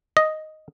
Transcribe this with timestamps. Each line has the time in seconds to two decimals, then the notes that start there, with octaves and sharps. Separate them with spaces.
0.17 D#5